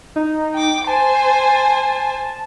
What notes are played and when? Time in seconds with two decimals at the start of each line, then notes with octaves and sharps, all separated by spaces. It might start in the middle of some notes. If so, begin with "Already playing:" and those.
0.16 D#4
0.54 G5 D6
0.87 C5 G#5 A5